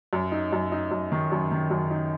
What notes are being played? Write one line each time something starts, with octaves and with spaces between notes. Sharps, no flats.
F#2
D#4
F#2
D#4
F#2
D#3
F#2
D#3
F#2
D#4